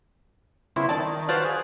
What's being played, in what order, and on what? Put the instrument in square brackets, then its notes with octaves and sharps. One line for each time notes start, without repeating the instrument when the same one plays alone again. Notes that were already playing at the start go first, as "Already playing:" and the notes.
[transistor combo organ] C#3 B3 C4 [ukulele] E4
[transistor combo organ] D#3 [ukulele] D5 A5
[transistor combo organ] F#4 F5 A5 [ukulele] B4 C5 D5
[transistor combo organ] G#4